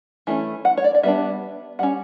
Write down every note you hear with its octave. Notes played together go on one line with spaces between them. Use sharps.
E3 A3 C#4
F#5
C#5
D5
D5
G3 B3 D4 E5
G3 C#4 F#5